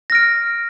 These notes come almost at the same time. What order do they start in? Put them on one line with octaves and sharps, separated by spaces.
A#6 F6 D7